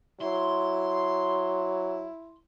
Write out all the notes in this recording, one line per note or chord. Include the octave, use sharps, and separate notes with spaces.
F#3 E4 C6